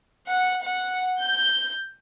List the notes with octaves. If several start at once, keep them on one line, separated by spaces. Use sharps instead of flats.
F#5
F#5
G6